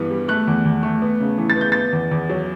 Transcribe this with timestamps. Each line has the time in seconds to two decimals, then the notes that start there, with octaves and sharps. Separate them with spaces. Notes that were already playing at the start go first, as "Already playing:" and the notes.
Already playing: G2 E3 G3 B3
0.11 G3
0.28 A3 F#6
0.48 E2
0.66 E2
0.83 A3
1.02 B3
1.20 C#3
1.38 E3
1.50 A6
1.56 B3
1.61 G6
1.72 B3 A6
1.93 E2
2.11 E2
2.29 F#3